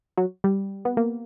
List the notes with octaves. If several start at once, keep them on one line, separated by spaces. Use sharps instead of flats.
F#3
G3
B3
A#3